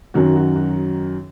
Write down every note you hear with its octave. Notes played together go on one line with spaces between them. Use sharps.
F#2 D#3 F#3 F#4
F#4
F#4